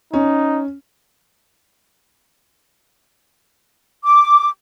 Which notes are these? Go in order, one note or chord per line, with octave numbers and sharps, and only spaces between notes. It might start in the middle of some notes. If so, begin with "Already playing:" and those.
C#4 D#4
D6